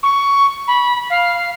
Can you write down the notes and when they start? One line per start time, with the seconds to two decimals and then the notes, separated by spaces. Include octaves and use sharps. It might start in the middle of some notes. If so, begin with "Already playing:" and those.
0.03 C#6
0.67 B5
1.10 F5